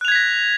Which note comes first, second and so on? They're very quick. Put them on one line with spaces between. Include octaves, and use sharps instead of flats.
F#6 F7 G#6 B6 A#6